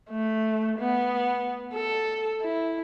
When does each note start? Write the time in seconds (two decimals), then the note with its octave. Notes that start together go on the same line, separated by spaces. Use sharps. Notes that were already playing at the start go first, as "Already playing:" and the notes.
0.10 A3
0.79 B3
1.73 A4
2.43 E4